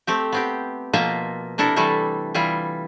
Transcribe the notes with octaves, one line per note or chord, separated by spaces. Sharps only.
A3 C4 G4
B3 C4 G4
B2 F3 A#3 F4 C5 E5
C3 D4 E4 A4 A#4
E3 G3 A3 E4 A4
E3 G3 E4 F4